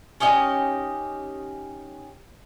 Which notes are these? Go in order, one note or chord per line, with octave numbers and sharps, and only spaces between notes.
C#4 D#4 G4 D#5